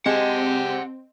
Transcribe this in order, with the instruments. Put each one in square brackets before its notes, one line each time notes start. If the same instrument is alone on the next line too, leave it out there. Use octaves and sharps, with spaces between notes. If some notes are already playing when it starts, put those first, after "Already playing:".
[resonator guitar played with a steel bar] G#3 [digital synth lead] C4 [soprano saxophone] G4 [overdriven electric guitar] F#5 A5